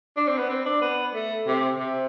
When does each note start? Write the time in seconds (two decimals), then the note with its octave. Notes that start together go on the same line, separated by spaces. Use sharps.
0.17 D4
0.28 C4
0.38 B3
0.50 C4
0.65 D4
0.82 B3
1.14 A3
1.47 C3
1.79 C3